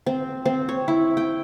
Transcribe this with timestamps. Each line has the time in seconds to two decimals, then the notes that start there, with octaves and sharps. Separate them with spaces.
0.06 C4
0.46 C4
0.69 C#5
0.88 E4
1.17 G5